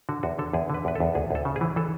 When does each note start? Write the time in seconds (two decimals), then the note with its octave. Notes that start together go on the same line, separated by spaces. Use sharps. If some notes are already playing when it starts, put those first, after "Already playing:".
0.09 D3 F#4
0.23 E2 F#4
0.39 D3 A4
0.53 E2 G#4
0.70 D3 B4
0.85 E2 B4
0.95 E2 A4
1.15 D2 G#4
1.31 D2 A4
1.45 C#3
1.56 G#4
1.61 E3
1.76 E3 A4